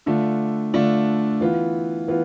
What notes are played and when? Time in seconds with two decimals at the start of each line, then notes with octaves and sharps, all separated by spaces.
0.06 D3 A3 D4 F4
0.74 D3 A3 D4 F4
1.41 E3 B3 F4
2.08 E3 B3 F4